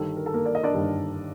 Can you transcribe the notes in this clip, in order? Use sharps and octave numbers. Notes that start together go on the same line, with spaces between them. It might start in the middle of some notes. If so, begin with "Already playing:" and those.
Already playing: G1 G2 D#3 G3 A4
A#4
A4
A#3 A#4
D5
D#5
D4 D5
G1 G2 D#3 G3